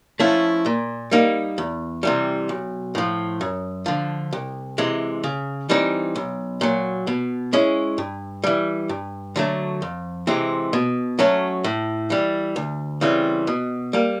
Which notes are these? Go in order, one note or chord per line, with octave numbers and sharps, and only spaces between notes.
F3 A3 C#4 E4
A#2
G3 A#3 D#4
E2
C3 E3 G3
B1
A2 F3
F#2
D3 F3
C2
C3 E3 G#3
C#3
E3 G3 C4 D#4
B1
A#2 F#3
B2
G#3 C#4 E4
G2
E3 G3
G2
D3 F#3 A3
F2
C3 E3 G#3 C4
B2
F#3 A3 C#4
A2
E3 G3
D2
C#3 E3 G3 C4
B2
G3 A#3